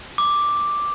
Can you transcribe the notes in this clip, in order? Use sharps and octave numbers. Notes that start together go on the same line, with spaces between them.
D6